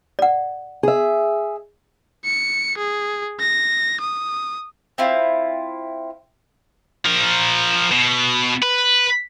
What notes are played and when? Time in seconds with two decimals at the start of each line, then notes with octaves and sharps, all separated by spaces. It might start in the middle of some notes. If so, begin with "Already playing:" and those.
0.19 D5 F#5
0.83 G#4 E5
2.25 C#7
2.77 G#4
3.40 A#6
4.00 D#6
4.98 C4 E4 F4
7.05 F3 A#4
7.92 B2
8.63 B4